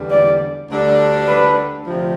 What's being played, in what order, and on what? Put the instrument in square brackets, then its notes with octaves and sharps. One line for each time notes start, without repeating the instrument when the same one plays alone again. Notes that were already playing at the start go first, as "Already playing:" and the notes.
Already playing: [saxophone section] E2 D3 G3
[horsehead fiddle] D5
[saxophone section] D2 D3 G3 D4 A4
[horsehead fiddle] B4
[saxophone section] D2 C3 F3